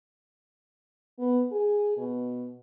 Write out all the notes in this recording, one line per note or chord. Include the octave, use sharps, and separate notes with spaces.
B3
G#4
B2